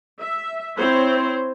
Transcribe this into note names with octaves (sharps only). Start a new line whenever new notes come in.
E5
C4 E4 C5 C#5